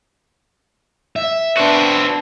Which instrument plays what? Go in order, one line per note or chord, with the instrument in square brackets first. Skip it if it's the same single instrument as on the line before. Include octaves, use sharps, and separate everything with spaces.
[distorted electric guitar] E5
[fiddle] B3 D4 [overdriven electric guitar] C4 F#4